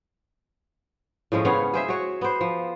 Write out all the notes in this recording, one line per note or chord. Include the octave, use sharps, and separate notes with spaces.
A2 F3 G#3 C#4
C#3 B3 C#5 F5
G#4 C5 E5
F#4 C#5
B3 C5
F3